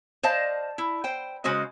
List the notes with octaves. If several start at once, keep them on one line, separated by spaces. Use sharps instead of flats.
C5 D5 D#5 F5 A5
E4
C5 G5
C#3 G#3 F#4 C5 D#5